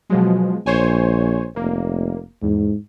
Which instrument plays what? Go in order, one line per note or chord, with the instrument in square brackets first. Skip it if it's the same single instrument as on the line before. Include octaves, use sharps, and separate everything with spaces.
[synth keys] B2 F3 G#3 [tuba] F#3
[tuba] A#1 [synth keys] C5 C#5 G#5
[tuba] F1 [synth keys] A#3
[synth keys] E2 [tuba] G#2